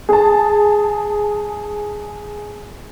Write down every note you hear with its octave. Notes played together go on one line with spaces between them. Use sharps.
G#4 A5